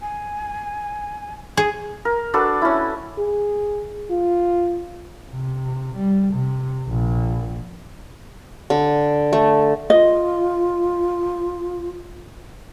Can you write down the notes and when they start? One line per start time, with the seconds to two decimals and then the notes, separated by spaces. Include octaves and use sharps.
0.01 G#5
1.57 G#4 G#5
2.05 A#4
2.34 D4 F#4 A4 B4
2.62 C#4 E4
3.19 G#4
4.11 F4
5.32 C3
5.96 G3
6.34 C3
6.88 A#1
8.70 D3
9.33 A3
9.90 F4 D#5